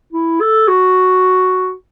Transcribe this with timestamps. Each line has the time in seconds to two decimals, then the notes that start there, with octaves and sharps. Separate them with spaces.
0.13 E4
0.41 A4
0.68 F#4